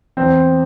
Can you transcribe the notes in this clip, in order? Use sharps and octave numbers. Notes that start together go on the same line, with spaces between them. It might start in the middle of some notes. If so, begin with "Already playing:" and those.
E2 C4